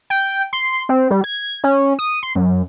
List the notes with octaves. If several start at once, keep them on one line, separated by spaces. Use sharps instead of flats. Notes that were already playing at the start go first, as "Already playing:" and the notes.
G5
C6
C4
G3
G#6
C#4
D#6
C6
F#2